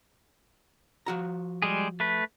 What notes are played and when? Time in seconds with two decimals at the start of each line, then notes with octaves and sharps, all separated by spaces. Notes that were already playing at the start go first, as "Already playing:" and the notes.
1.06 F3 F#4 A#5
1.62 G3 G#3 G#4
2.00 A3 B4